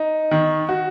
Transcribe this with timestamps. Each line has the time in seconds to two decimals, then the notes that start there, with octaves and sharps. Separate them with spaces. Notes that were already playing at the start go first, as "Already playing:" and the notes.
Already playing: D#4
0.31 D#3
0.69 F#4